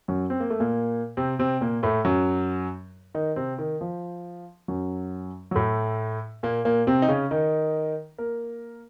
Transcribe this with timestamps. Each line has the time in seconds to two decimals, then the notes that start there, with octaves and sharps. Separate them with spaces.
0.08 F#2 F#3
0.30 C4
0.40 A#3
0.50 A3
0.60 A#2 A#3
1.17 C3 C4
1.39 C3 C4
1.61 A#2 A#3
1.83 A2 A3
2.05 F#2 F#3
3.15 D#3 D#4
3.36 C3 C4
3.58 D#3
3.81 F3
4.68 F#2 F#3
5.51 F#3
5.55 A2 A3
6.43 A#2 A#3
6.65 A#2 A#3
6.87 C3 C4
7.02 D#4
7.08 C#3 C#4
7.31 D#3 D#4
8.18 A#3 A#4